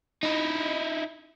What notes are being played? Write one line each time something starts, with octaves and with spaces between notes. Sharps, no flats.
D#4 E4